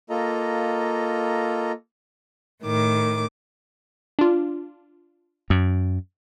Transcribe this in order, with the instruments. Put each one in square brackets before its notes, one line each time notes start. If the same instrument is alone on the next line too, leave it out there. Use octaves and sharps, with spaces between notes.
[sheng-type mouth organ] A#3 F4 A4 D#5 A#5
[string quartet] A2 D#3 D6
[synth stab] D4 F4
[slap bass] F#2